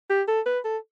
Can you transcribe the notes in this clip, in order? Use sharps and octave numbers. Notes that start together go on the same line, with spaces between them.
G4
A4
B4
A4